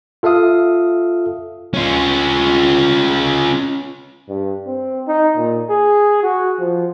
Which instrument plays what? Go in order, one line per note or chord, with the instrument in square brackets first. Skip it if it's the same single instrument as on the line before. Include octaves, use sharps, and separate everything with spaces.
[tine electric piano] F4 A4 E5 F5 D#6
[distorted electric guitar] C#4 F4
[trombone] G2
C4
D#4
A#2
G#4
F#4
F3